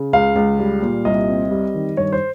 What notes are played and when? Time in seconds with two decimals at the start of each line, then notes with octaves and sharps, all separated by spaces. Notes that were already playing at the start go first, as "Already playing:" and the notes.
Already playing: C#3
0.13 C#2 F5
0.36 C#2
0.59 G3
0.82 A#2
1.05 C2 D#5
1.28 C4
1.51 G3
1.74 D#3
1.97 G2 C#5
2.13 C5